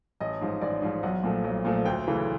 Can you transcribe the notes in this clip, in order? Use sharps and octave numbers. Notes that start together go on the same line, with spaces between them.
A1 D#5
G#2 F3
A1 D5
G#2 F3
B1 F#5
A#2 F3 A3
B1
A#2 F3 A3
D2 G5
C#3 E3 A3